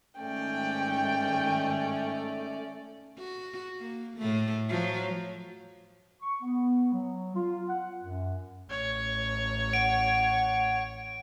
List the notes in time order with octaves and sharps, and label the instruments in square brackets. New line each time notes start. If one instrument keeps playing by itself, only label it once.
[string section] G#2 D#3 [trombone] A3 [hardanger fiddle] C#4 D5 [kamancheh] G5
[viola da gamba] F#4
A#3
A2 A3
F3 F#3
[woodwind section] C#6
B3
F#3
F4
F#5
F#2
[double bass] A1 [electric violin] C#5
[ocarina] F#5 [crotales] D7